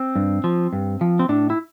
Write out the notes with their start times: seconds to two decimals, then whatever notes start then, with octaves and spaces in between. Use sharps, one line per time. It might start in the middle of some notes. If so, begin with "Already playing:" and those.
Already playing: C4
0.16 G2
0.44 F3
0.73 G2
1.01 F3
1.19 C4
1.29 A2 D4
1.50 E4